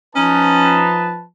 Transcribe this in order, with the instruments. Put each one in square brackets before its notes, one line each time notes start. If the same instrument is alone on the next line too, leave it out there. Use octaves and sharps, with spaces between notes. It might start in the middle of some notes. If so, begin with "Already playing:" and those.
[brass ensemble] F3 B4 A5 [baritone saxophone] C#4 [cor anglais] D#4